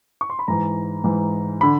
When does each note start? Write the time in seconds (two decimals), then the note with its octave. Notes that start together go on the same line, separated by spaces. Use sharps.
0.21 C#6
0.30 C6
0.39 B5
0.48 G#2 E3 A#5
1.04 G#2 E3
1.61 D3 B5